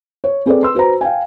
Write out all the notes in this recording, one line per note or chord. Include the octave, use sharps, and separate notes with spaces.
C#5
C4 G#4 A4 B4 D5
B4 C6 E6
F#4 B4 C5 A#5
F5 G5 G#5